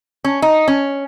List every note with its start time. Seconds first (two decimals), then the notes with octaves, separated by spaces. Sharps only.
0.24 C#4
0.42 D#4
0.68 C#4